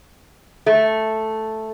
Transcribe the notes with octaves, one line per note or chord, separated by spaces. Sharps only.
A3